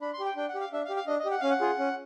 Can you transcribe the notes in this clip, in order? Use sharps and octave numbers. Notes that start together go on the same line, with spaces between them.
D4 B5
C6
G4
G5
D4 G5
F#5
G4
F5
D4 E5
F5
G4
F5
D4 D#5
D#5
G4
F#5
C#4 F5
F#5
F4 G#4
C#4